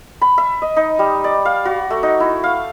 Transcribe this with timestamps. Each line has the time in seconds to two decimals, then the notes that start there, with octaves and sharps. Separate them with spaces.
0.21 B5
0.38 E5
0.62 D#5
0.76 D#4
0.99 G3
1.24 D5
1.45 F5
1.65 F#4
1.90 A3
2.03 D#4
2.20 E4
2.44 F5